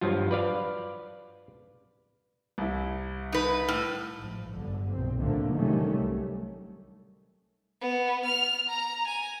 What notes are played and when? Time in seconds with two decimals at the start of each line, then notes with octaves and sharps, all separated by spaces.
0.01 G2 F3 F#3 F4
0.31 B4 D5 F5
2.58 C2 E4
3.32 D#4 B4
3.68 A2 F6
4.19 A1 G#2 F3
4.56 G1 D3
4.92 B1 A#2 C4
5.22 C#2 A2 D3 F3 A3 A#3
5.55 C3 D#3 F#3 G3 A3 C#4
5.92 C2
7.81 B3
8.25 F6
8.69 A#5
9.08 G#5